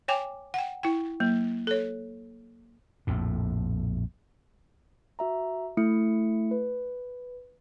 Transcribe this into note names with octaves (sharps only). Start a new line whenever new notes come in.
C#5 G5 G#5 D6
F#5 G5
E4 G5
F#3 A#3
A4 C#5
A#1 F2 A2
F#4 E5 A#5
A3 E4 C#7
B4